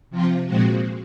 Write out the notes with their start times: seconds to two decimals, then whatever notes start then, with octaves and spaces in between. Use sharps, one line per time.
0.10 C3 F3 C4 F4
0.47 A#2 F3 G#3 C4 F#4